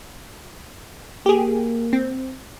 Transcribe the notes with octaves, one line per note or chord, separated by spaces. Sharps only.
A#3 G4 G#4
C4